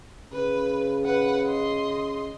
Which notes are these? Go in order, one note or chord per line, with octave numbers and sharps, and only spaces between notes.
C#3 B4
B4 F#5
D#5 C6